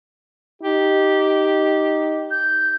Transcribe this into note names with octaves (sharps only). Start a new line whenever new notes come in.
D#4 G4
G6